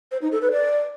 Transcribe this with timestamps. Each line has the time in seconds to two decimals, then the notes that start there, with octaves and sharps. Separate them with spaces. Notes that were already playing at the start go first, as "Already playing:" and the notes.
0.12 C5
0.22 D#4
0.32 A4
0.42 B4
0.52 D5